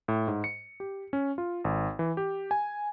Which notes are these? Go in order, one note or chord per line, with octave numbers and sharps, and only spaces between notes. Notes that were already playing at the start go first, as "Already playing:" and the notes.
A2
G#2
C#7
G4
C#4
F4
G#1
E3
G4
G#5